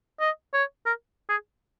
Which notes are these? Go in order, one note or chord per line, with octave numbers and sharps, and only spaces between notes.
D#5
C#5
A#4
G#4